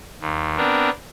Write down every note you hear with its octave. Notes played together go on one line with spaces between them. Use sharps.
D#2
B3 C4 D4 A#4